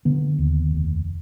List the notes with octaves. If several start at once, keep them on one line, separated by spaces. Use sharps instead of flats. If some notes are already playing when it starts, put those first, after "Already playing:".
D3 B3
D#2
F1